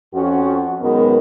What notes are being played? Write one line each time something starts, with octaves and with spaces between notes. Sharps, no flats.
F2 C#4 F#4
F#2 B2 D#3 G#3 B3